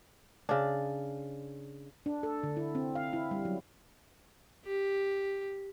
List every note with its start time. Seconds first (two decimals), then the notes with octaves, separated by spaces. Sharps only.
0.49 C#3 D4
2.06 D4
2.23 A4
2.43 D3
2.57 E4
2.75 C4
2.95 F5
3.13 E4
3.31 G3
3.45 F#3
4.66 G4